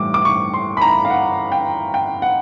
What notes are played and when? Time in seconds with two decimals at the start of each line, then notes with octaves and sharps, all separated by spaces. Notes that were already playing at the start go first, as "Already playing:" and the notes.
Already playing: A2 E3 G3 D6
0.14 D6
0.25 C#6
0.54 C6
0.77 B5
0.81 A#5
1.05 F5
1.10 F#5
1.52 G5
1.94 G5
2.22 F#5